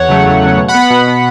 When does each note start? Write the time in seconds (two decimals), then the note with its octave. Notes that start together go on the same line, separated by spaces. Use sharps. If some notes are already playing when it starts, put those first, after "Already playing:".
Already playing: E2 C#5 F#5
0.09 C#3 F#3 A3
0.25 E2
0.42 C#3 F#3 A3
0.58 B2
0.68 F#5 B5
0.75 B3
0.80 F#5 B5
0.90 B2
1.08 B3